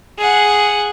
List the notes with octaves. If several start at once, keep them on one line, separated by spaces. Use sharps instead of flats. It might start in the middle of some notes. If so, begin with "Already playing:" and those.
G#4 F#5